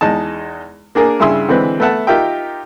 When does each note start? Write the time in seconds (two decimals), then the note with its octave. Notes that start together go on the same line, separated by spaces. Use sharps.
0.01 E2 G#3 D#4 A5
0.95 A#3 D4 G#4 A#4
1.20 G2 C#3 E4 G#4 C6 E6
1.49 D3 E3 G#3 C4 B4
1.80 A3 B3 E5 F#5 A5
2.07 D#4 F4 G4 A#4 E5 G5